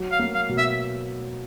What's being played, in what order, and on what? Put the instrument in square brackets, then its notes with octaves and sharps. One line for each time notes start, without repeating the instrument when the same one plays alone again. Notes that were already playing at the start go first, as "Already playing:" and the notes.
Already playing: [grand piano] F#3
[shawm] F5
[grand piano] A#3
[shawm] F5
[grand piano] B2
[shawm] E5